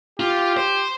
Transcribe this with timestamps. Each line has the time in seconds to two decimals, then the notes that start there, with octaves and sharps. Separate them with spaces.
0.20 F4 G4
0.57 C5